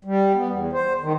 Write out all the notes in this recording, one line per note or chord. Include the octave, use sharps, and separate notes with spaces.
G3
B3
E2
C5
D#3